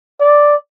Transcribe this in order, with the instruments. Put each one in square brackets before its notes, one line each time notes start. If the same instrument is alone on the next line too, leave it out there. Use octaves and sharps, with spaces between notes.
[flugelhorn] D5